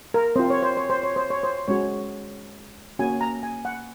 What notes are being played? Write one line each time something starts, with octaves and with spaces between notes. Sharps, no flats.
A#4
C4 F4 C5
C#5
C5
C#5
C5
C#5
C5
C#5
C5
G#3 C#4 F#4 C#5
A#3 C#4 F#4 G#5
A#5
G#5
F#5